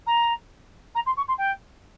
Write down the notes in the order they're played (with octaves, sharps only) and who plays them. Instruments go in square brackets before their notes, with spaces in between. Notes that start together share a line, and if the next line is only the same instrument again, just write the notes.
[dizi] A#5
A#5
C6
C#6
C6
G5